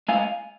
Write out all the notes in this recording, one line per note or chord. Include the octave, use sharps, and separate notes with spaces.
G#3 F5 G#5